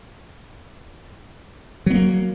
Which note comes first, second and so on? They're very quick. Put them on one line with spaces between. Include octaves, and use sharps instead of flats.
F#3 B3 A#3